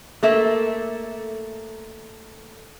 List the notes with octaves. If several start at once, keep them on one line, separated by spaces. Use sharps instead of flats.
A3 A#3 A4 E5